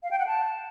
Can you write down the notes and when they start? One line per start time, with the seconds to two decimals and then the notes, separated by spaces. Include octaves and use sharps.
0.03 F5
0.11 G5
0.19 F#5
0.27 A5